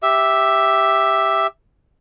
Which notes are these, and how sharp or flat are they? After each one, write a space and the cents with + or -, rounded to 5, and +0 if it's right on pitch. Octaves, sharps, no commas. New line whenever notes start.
G4 +0 E5 +0